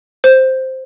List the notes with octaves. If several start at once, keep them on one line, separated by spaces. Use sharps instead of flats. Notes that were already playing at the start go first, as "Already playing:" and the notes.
C5